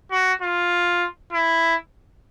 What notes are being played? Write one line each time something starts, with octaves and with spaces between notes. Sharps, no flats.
F#4
F4
E4